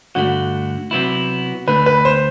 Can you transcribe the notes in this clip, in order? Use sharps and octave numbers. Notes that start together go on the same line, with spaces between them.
G2 D3 A3 F#4
C3 F#3 B3 E4
D2 D3 A3 B4
B4
C5